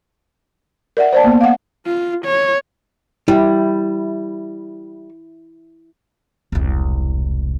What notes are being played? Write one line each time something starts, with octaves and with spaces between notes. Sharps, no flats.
A#4 D5 E5 F#5
C5 D5 A5
A#3 B3
F5 F#5
F4
C#5
G3 E4
E1 C2